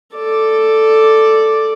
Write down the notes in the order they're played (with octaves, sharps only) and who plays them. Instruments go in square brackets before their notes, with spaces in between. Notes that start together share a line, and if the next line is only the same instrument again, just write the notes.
[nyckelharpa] A4 D5